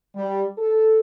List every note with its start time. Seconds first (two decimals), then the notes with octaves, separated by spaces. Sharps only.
0.15 G3
0.58 A4